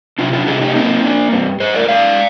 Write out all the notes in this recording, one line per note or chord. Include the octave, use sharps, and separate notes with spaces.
C3 D4 F4
D4 F4
C3 F4 G#4
D#4 G4
A#3 C4 D#4
A#3 D4
G2 C4
G2 G#4 C5
A#4 D5
G#3 D5 F5